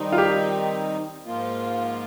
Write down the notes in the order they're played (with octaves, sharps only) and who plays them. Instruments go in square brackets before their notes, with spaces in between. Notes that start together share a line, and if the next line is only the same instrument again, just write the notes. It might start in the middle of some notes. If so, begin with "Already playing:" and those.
Already playing: [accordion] D#3 G3 C4 D#4
[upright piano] F4
G4
[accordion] G#2 F3 A#3 F4